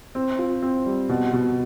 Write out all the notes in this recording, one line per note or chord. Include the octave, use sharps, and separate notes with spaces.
C4
F4
C4
G3
B2
B2